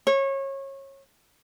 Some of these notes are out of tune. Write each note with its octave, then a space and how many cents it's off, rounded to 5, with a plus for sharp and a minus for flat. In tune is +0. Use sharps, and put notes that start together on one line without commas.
C#5 -25